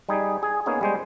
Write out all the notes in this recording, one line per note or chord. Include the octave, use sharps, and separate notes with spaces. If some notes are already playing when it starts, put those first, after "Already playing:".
G3 D#4 G#4
G#4
A#3 B3 C#4 D#4 G#4
G3 G#3 C5